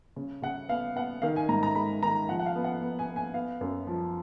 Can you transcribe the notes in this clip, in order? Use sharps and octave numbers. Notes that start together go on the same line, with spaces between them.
C#3
C#3 F#5
B3 F5
B3 F#5
D#3 F5
G#5
G#2 A#5
A#5
G#3 B5
D#3 A#5
F3 F#5
F#5
F5
B3
F#5
B3
G#5
B3
G#5
B3 F5
F#2
F3